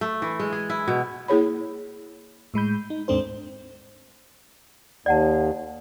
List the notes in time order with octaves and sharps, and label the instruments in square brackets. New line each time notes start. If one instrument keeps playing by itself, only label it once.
[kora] A3
E3
G#3
G#4
E4
B2
[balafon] A#3 E4 G#4 C#5 B5
[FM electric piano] A2 G#3 B5 G6
D#4
D#2 G#2 C4 D4 A4 C5
[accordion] D#2 [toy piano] D5 F#5 A5